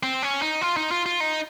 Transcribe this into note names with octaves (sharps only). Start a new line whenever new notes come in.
C4
C#4
D#4
F4
D#4
F4
F4
D#4